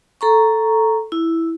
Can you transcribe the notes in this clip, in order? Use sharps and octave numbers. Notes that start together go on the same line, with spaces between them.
A4 A#5 C#6
E4